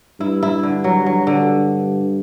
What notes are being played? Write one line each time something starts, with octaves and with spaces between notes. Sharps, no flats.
G2 E4
E4
D3
F#3
F#3
D3